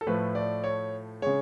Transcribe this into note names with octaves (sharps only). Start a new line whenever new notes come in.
A4
A2 F3 A3 B4
D5
C#5
C#3 G#3 C#5